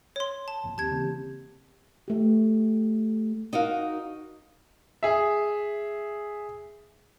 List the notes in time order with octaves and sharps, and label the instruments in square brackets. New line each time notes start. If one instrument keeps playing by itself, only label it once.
[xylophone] C#5 C6
A5
[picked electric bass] A#1 F2 A#2
[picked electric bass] D#2 [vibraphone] C4 G4 [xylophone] A5 G#6
[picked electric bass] C#3 E3 A#3
[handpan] A3 G4
[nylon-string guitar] D#4 F#4 A#4 F5
[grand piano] G#4 E5